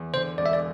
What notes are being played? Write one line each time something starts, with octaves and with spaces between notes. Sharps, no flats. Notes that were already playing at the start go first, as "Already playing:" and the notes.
Already playing: E2
D3 C5
E1 D5
E5
D5